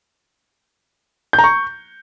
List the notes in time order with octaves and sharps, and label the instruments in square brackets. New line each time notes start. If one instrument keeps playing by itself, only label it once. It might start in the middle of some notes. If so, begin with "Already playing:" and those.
[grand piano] G6
A#5
C#6